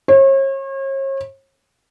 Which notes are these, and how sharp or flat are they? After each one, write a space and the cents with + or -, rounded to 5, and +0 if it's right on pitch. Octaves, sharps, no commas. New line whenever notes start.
C#5 -40